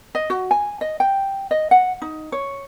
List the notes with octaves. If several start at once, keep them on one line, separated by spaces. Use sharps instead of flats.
D#5
F#4
G#5
D#5
G5
D#5
F#5
D#4
C#5